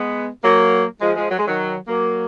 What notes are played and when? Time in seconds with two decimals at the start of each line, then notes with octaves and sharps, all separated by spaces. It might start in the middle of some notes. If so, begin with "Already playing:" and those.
Already playing: G#3 B3
0.44 F#3 A#3
1.01 F3 G#3
1.16 F3 G#3
1.30 F#3
1.39 G#3
1.47 D#3 F#3
1.88 F#3 A#3